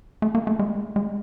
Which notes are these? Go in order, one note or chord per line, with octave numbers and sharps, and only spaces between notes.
A3
A#3
A3
G#3
G#3